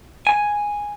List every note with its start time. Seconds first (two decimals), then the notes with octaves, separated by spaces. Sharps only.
0.27 G#5